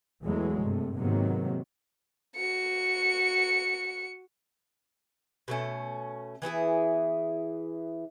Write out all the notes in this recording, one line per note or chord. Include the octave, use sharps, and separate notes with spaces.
E2 E3 F#3 G#3 A3
G2 C3 A3
G#2 C3 D#3 F#3 A#3 B3
F#4 C#7
B2 A3 C#4
E3 B3 E4 G#4